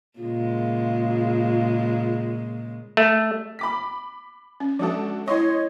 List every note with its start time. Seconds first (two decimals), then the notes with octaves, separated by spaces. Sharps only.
0.19 A#2 C#3 G#3 F4
2.97 A3
3.59 B5 D6 B6
4.60 C#4
4.79 F3 G#3 D4 F#4 A4
5.28 E4 C#5 D#5 C6 C#6